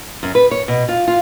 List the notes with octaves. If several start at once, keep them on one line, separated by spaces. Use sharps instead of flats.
F#2
B4
C#5
B2
F4
F4